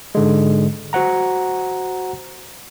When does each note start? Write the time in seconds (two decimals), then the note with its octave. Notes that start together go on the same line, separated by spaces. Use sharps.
0.15 G#2 D3 G#3
0.93 F#4 C5 F#5 A#5